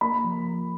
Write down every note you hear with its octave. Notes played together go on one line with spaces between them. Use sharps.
A#3 B5
F3